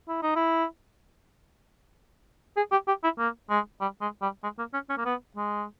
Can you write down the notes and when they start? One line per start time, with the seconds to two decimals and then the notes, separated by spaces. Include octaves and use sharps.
0.08 E4
0.22 D#4
0.35 E4
2.57 G#4
2.72 G4
2.88 G4
3.04 E4
3.19 A#3
3.50 G#3
3.81 G3
4.01 G#3
4.22 G3
4.43 G#3
4.58 A#3
4.73 C#4
4.90 C#4
4.98 A#3
5.05 B3
5.36 G#3